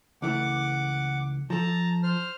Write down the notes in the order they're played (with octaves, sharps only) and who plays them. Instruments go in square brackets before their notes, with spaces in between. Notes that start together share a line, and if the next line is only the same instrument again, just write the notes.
[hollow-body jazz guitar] C#2 E3 A3 [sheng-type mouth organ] F#5 D6
[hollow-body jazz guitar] F3 A4 [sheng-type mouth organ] A5 A#5
[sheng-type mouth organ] C5 F6